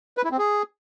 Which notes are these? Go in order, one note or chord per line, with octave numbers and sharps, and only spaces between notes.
B4
E4
C4
G#4